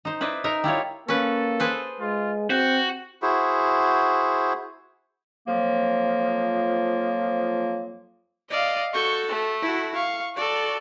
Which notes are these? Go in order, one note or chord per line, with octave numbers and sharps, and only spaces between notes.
D#4 C5
E4 B4 C5 D5 D#5
D#4 A#4 E5
G3 E4 F4 C#5
A#3 C#4 A4 B4
G#4 B4 C5
G#3 F4
C4 F#4 G6
E4 F#4 G#4 C5
F2 F3 F#3 A#3
D5 D#5 F5
F#4 A4 C#6 G6
A3
E4 F#4
F5 C#6
F#4 A4 D5